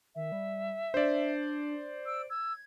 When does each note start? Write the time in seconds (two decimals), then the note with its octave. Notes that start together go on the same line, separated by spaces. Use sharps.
0.15 D#3 E5
0.32 G3
0.94 D4 C5 D5
2.06 E6 D7
2.30 E6 G#6